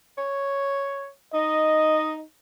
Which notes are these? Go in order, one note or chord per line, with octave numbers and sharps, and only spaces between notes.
C#5
D#4 D#5